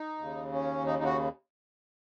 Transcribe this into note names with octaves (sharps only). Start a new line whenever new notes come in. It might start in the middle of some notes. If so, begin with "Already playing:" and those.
Already playing: D#4
D#2 C#3
C#4
D#4
D#4
F#4